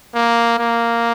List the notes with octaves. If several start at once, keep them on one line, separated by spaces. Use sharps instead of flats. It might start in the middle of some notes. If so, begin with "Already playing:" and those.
A#3
A#3